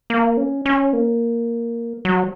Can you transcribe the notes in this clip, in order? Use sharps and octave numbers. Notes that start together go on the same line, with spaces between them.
A#3
C#4
C#4
A#3
F#3